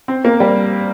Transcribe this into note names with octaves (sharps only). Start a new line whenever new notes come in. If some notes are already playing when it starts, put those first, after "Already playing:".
C4
A#3
G3